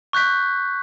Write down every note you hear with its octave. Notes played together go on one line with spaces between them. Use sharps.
C#6 F#6 G6 B6